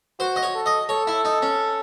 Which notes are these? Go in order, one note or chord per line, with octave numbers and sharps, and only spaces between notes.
F#4 C5
D#5
C#5
A4
D#5
A4 C#5
E4
D#4
C#4